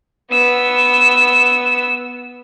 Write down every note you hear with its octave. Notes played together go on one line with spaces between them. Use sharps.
B3 E6